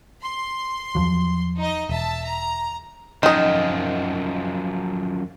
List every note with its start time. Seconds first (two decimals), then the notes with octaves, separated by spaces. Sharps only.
0.21 C6
0.95 E2 F3 F#3
1.57 D#4 D#5
1.89 E1 E5 A5
2.24 A#5
3.23 F#2 D#3 F3 D#5